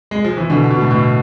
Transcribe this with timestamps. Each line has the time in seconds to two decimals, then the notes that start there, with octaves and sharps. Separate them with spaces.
0.11 G#3
0.24 F3
0.37 E3
0.50 B2 D3
0.71 B2
0.81 A2
0.91 B2